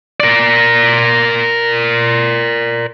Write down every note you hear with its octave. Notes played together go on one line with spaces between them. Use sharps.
A#4 D5